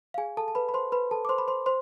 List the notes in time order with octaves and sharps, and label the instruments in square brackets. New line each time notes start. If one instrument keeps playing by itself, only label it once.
[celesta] F5
G#4 G#5
A4 A5
A5
B4 B5
B5
C5 C6
B4 B5
A4 A5
D6
C5 C6
B5
C5 C6
C5 C6